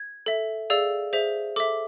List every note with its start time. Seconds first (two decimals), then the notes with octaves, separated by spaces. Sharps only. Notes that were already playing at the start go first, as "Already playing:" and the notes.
Already playing: G#6
0.26 A4 E5
0.70 G#4 D5 F5 E6
1.13 G#4 C5 E5
1.56 A4 E5 D6